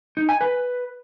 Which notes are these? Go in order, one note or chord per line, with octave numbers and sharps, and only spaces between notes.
D#4
G#5
B4